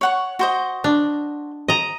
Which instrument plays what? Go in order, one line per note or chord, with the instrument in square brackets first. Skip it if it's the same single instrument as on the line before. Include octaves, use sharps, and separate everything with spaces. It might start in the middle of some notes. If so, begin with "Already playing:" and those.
[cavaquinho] C#5 F#5 C#6
F#4 C5 D#5
[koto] D4
D#5 A#5